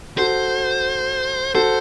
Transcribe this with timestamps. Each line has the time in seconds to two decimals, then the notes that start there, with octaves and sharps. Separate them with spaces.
0.18 F#4 A4 C5
1.54 F#4 A4 C5